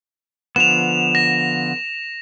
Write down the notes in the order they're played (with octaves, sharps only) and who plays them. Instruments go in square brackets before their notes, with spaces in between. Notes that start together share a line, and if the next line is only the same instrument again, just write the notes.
[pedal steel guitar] D3 F3 B3 [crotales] E7 F7
[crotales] A#6